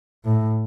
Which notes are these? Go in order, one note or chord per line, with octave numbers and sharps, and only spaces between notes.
A2